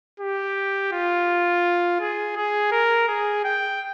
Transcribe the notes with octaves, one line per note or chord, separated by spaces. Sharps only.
G4
F4
G#4
G#4
A#4
G#4
G5